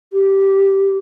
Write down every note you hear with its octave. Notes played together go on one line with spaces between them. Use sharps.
G4